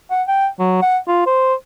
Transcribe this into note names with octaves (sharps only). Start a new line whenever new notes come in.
F#5
G5
F#3
F#5
F4
C5